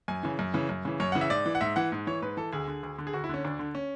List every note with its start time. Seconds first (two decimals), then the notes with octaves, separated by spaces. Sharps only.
0.08 F#2 G#5
0.23 C#3 E3
0.39 F#2
0.54 C#3 E3
0.69 F#2
0.85 C#3 E3
1.00 F#2 C#5
1.12 C#3 E3 F#5
1.21 E5
1.30 G#2 D5
1.46 E3
1.55 F#5
1.61 G#2 E5
1.76 E3 F#5
1.92 G#2
2.07 E3 C#5
2.22 G#2 B4
2.37 E3 A4
2.52 D2 G#4
2.68 D3
2.83 D2
2.98 D3
3.07 G#4
3.13 D2 F#4
3.24 E4
3.29 D3 C#4
3.44 D2 D4
3.59 D3
3.75 C#4